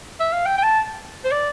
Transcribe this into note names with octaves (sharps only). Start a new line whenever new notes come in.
E5
F5
G5
G5
A5
C5
D5